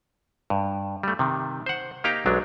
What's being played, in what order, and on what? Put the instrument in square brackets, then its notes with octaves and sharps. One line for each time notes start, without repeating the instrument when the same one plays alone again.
[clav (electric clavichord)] G2
G3 A3
C3 D#3
C5 F#5
A#3 D#4 G4 F5 G5 A#5
B1 F#3 G#3 D4